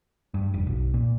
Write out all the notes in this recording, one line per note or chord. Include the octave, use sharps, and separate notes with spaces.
G2
F1
B1
A#2